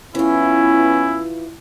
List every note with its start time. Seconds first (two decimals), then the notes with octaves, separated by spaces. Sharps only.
0.15 E3 B3 C#4 E4 F4